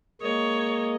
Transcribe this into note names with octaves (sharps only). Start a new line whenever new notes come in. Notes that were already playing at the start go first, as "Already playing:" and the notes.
G#3 A#3 C#5 D#5